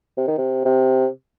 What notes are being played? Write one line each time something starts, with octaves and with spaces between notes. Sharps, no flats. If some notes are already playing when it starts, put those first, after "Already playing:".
C3
D#3
C3
C3